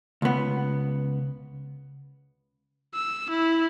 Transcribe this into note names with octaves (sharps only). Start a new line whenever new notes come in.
C#2 B3
E6
E4